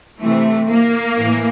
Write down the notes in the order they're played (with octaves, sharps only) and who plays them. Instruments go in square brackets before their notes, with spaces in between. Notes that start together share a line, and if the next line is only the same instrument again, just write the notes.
[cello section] C3 E3 A3
A#3
A2 E3